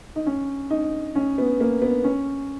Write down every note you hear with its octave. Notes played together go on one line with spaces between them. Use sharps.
D#4
C#4
D#4
C#4
B3
A#3
B3
C#4